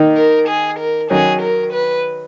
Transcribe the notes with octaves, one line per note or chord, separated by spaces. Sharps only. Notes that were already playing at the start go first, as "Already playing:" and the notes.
Already playing: D#3 A#3 D#4
A#4
G#4
A#4
D#3 F#3 C#4 G#4
A#4
B4